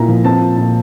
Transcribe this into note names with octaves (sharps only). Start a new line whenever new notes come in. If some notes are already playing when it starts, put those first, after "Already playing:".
Already playing: A#2 E4 A#5
F3
C4 A5
A#2
A#2 A5